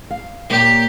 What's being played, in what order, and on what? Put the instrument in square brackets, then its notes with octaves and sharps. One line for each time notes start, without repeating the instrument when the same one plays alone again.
[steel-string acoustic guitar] F5
[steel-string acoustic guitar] A#2 A#3 C#5 [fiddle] G4